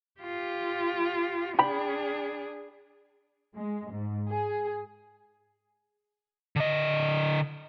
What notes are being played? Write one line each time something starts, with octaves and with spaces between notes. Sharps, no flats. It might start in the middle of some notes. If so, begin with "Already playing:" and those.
F4 G4
D4 G#4 G5 B5
G#3
G#2
G#4
D3 D#5